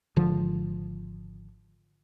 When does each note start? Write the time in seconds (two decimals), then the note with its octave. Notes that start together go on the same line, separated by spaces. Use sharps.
0.16 G#1 D3 F3